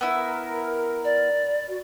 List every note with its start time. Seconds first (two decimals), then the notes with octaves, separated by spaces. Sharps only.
0.01 B3 E4 A#4
1.05 D5
1.68 F#4